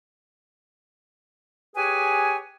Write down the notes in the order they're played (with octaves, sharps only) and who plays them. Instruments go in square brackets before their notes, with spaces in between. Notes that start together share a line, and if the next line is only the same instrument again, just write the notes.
[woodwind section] G4 G#4 B4 C#5 G#5